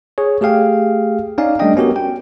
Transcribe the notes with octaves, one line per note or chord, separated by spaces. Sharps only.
G#4 C#5
A3 G4 G#4 F5 G5
C#4 D#4 D5 F5 G#5
G3 A3 D4 D5 D#5 G5
B3 C#4 F#4 G4 A#4
G5